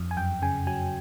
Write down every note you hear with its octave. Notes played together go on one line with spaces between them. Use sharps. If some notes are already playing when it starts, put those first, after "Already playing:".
Already playing: F2
G#5
F#2 G5
C#3 G#5
F#3 G#5